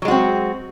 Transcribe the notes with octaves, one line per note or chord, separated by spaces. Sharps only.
F#3 G#3 C4 F#4